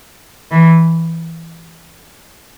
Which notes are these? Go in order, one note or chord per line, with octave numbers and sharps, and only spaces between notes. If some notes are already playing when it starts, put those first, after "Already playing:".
E3